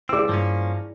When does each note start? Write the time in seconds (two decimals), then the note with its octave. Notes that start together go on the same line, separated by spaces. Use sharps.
0.09 C#2 C4 E4 G#4 D5 E6
0.29 G2 F3 A#3 C#4